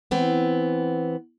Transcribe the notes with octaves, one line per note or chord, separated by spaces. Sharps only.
E3 B3 C4